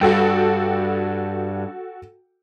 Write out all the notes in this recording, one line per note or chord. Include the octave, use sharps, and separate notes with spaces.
G2 F#4 A4 G5